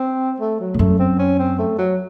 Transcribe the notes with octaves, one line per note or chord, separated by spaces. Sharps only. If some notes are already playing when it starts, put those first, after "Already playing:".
Already playing: C4
A3
F#3
A2
F#2 A3
C4
C#4
C4
A3
F#3